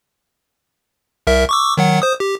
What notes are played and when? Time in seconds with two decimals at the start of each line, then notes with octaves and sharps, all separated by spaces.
1.27 C2 A#4 E5
1.49 C#6 D6 E6
1.77 D#3 F#3 F#5
2.02 C5 D#6
2.20 G4